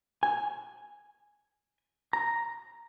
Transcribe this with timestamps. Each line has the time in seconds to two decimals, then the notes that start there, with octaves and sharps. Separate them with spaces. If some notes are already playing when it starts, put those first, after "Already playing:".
0.23 G#5
2.13 A#5